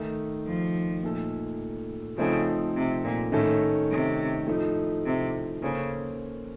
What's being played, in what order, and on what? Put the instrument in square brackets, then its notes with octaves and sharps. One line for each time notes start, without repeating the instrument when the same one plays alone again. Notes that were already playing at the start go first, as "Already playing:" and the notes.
Already playing: [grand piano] D#3 A3 D#4
[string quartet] F3
[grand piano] A#2 A3 D#4 A4
[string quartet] C#3 [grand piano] F3 A3 C4 D#4 A4
[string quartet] C3
A#2
[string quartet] A2 [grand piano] D#3 A3 C#4 A4
[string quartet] C3
[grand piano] A2 F3 A3 D#4
[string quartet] C3
[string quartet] C#3 [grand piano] A#3 C#4 A4 C5